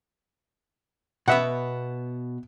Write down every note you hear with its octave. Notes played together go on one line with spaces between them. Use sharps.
B2 B3 E5 F#5